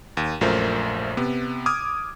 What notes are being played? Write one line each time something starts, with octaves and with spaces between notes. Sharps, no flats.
D#2
A#1 F#2 A3 F4 A#4 C5
C3 B3
D6 D#6 F6 G#6